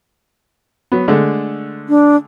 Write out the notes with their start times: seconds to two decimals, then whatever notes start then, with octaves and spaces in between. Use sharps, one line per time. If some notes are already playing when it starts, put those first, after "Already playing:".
0.92 F#3 B3
1.08 D3 G#3 A3
1.89 D4